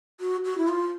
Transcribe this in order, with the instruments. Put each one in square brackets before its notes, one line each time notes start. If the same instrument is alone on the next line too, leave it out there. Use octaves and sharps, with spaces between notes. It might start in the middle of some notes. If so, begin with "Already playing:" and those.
[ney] F#4
F#4
E4
F4